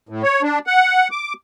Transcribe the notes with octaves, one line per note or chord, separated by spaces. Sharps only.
A2
C#5
D4
F#5
D6